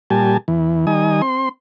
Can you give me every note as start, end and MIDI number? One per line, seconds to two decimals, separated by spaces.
0.10 0.37 46
0.10 0.37 55
0.10 0.37 67
0.10 0.37 80
0.10 0.37 81
0.48 0.86 40
0.48 0.86 52
0.87 1.22 51
0.87 1.22 55
0.87 1.22 63
0.87 1.22 80
0.87 1.22 87
1.22 1.49 60
1.22 1.49 84